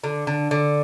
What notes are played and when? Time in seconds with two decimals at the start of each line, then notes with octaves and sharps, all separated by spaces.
0.04 D3
0.27 D3
0.51 D3